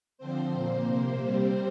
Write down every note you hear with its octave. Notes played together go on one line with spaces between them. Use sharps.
D3 F3 C4 C5
A#2 A#3
C3 A#3 C5
C3 G3 C4